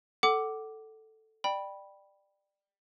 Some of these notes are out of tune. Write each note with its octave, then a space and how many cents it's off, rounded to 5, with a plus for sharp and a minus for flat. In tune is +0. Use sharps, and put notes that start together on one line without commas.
A4 +0 F#5 +25 D6 +0
D5 +20 G5 +0 B5 -10